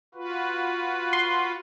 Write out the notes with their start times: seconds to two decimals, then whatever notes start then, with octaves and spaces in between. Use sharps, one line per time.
0.15 F4 F#4 B4
1.13 C6